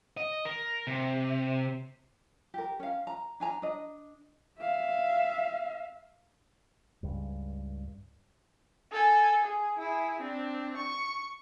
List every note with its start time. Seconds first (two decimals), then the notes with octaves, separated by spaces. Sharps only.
0.17 D#5
0.45 A#4
0.87 C3
2.54 G4 A#4
2.80 C#4 F5
3.07 A#5
3.40 D4 G#5 A#5
3.62 D4 D#5
4.59 E5 F5
7.03 C#2 G2
8.92 A4 G#5
9.43 G#4
9.78 E4 G#4
10.21 C4 D4
10.77 C#6